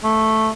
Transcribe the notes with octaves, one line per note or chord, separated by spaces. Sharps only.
A3